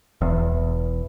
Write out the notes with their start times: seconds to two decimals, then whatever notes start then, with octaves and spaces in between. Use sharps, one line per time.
0.21 E1 E2